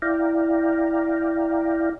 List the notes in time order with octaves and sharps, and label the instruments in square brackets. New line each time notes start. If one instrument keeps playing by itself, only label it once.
[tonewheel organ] E4 D5 F5 G5 A#5